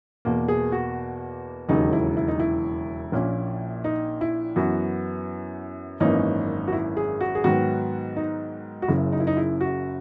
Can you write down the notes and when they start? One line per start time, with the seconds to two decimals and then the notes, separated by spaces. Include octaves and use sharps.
0.25 E2 B2 A#3
0.48 G#4
0.72 F#4
1.68 E1 D#2 C#3 F#3 D#4
1.93 E4
2.17 E4
2.28 D#4
2.40 E4
3.12 A#1 A#2 A#3 C#4
3.84 D#4
4.21 E4
4.56 F#2 E3 B3 F#4
6.00 G#1 F#2 E3 A#3 C#4 D#4
6.68 F#4
6.73 E4
6.97 G#4
7.21 F#4
7.35 G#4
7.44 G#2 D#3 F#3 B3 F#4
8.16 D#4
8.82 F#4
8.88 F#1 F#2 C#3 E4
9.12 D#4
9.20 E4
9.27 D#4
9.37 E4
9.61 F#4